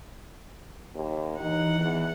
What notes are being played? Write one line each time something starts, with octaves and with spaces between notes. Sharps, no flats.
D#2
E3 D#4 F#5
E2